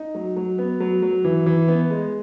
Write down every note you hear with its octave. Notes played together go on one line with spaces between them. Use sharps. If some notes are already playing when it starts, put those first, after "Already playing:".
Already playing: D#4
F#3
F#3
B3
F#3
F#3
E3
E3
B3
G#3